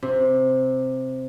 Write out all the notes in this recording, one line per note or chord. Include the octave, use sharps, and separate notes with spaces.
C3